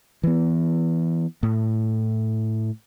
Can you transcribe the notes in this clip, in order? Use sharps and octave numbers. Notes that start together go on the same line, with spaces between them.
E3 B3
A2